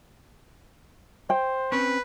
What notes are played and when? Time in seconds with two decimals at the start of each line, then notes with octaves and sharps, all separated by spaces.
1.30 C5 G5
1.72 C4 C#4 B4 C#5